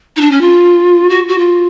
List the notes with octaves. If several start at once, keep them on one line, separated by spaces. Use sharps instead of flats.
D#4
D4
C#4
F4
F#4
F#4
F4